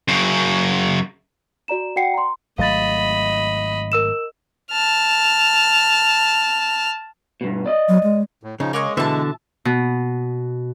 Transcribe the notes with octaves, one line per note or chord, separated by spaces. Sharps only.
F#2 C#3
F#4 D5 A#5 E7
F#4 D5 F#5 G5 C7 C#7
A#5 C6
G#1 F#3 A3 D#5 F5 B5 A6
A#4 E6 E7
A5 F6
G2 B2
D5 D#5
F#3
G#3
A2
C#3 F3 D#4
G#3 A#3 C#5 D#5
B2 D3 E3 E5 A5
B2